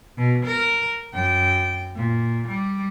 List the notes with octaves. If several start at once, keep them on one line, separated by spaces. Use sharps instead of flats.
B2
A#4
F#2 G5
A#2
G3